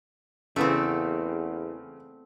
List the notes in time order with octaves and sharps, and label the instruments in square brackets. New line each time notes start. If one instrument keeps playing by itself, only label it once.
[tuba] E2 [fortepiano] C#3 E3 [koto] A3 B3 C4